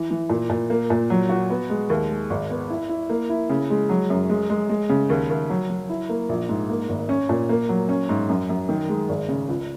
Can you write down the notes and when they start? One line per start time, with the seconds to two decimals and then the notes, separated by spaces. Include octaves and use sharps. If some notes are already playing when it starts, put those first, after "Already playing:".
Already playing: E3
0.10 E3
0.29 A#2
0.50 A#2
0.70 A#3
0.90 A#2
1.10 F#3
1.29 F#4
1.50 B3
1.70 G#3
1.90 D#2
2.10 G#3
2.30 G#1
2.50 B3
2.70 E4
2.89 E4
3.10 A#3
3.30 E4
3.49 C#3
3.70 G#3
3.89 F#3
4.10 F#2
4.29 G#3
4.50 G#3
4.69 G#3
4.89 C#3
5.10 D#2
5.29 D#2
5.49 F#3
5.70 F#3
5.89 E4
6.09 A#3
6.29 A#1
6.49 G#2
6.69 A#3
6.89 G#1
7.09 C#4
7.29 A#2
7.49 A#3
7.69 F#3
7.89 C#4
8.09 G#2
8.29 F#2
8.49 F#2
8.69 D#3
8.89 G#3
9.09 G#1
9.28 C#3
9.49 C#2